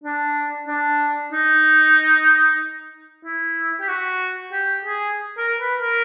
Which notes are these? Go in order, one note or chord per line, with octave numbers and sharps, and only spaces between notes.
D4
D4
D#4
E4
G4
F#4
G4
G#4
A#4
B4
A#4